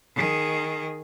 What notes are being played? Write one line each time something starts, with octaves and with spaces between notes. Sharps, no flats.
D#3 G#4